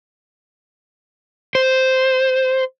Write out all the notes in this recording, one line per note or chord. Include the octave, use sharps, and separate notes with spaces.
C5